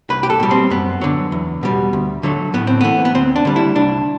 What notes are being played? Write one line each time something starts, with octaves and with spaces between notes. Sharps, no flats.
C2 B4
G4
A4
B2 G3
C4
F#2 B3
D3 F#3
E2
B2 G3
D2
D3 F#3 A3
A2 B3
C4
E3 A3 B3
B3
D2 C4
D4
D3 G3
E4
C2 D4